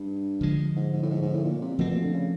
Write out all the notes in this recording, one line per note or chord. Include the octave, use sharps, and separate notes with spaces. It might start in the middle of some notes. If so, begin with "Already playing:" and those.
Already playing: G2
D3 F3 G#3
G#2
G#2
A2
G#2
G#2
A2
A#2
C3
B2 F3 A3 C4
A#2
D3
C#3